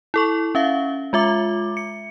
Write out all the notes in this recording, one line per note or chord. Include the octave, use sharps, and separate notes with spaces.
E4 A4 C#6
C#4 E5 F5
G#3 F4 E5 D6
C#7